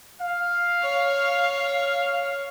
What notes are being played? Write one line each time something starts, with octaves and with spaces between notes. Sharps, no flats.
F5
C#5